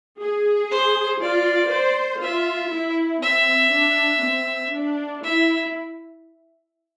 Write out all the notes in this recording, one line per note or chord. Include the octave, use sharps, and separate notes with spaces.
G#4
C5
F4 D5
C5
F4 E5
E4
C4 E5
D4
C4
D4
E4 E5